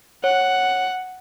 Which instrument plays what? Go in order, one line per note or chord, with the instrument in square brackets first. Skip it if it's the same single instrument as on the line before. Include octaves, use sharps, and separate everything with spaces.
[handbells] C#5 [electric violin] F#5